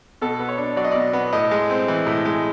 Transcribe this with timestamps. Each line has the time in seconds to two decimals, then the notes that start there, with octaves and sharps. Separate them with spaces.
0.22 B2 A4
0.40 B3
0.49 C#5
0.58 D4
0.76 F#3 D5
0.84 D#5
0.91 B2 D5
1.13 B3
1.33 A2 D#5
1.51 G#3
1.70 C4
1.88 E3
2.07 A2
2.25 G#3